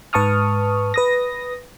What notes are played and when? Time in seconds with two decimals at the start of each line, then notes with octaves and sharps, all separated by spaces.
0.13 G#2 B4 A5 C#6 D#6 F6
0.94 B4 D#6 A#6